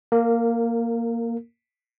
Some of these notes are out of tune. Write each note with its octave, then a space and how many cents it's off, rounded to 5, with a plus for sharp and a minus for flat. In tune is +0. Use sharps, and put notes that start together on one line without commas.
A#3 +0 A#4 -25